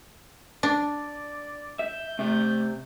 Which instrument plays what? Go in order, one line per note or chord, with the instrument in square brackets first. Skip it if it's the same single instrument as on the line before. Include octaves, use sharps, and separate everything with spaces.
[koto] D4 [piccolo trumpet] D5
[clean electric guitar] E5 [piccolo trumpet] G6
[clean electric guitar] C3 [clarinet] A3